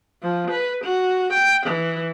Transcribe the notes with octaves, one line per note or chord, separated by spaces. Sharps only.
F3
B4
F#4
G5
E3